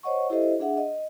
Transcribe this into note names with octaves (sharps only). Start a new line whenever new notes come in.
C5 C#5 D#5 F#5 C#6
E4 G4 A4 C5 D#5 E5
D4 G#4 E5 F#5
D#5